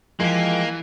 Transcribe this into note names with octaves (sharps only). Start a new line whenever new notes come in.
E3 F3 G#3 A#3 G4